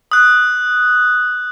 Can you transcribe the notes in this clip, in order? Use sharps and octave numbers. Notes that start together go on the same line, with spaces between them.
D#6 F#6